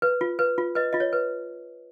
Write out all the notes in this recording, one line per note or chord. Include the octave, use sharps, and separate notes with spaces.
B4
F4
B4
F4
B4 D#5
F4 D#5
C#5
B4